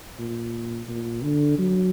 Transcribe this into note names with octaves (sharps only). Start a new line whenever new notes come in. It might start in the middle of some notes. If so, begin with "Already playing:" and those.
A#2
A#2
D3
F#3